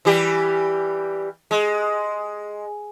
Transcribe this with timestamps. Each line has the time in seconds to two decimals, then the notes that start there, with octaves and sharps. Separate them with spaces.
0.05 E3 G3 G4
1.51 G#3